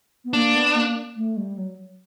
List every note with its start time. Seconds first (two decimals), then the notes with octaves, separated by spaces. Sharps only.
0.25 B3
0.33 A#3 D4
0.55 B3
0.75 A#3
1.16 A3
1.37 G3
1.57 F#3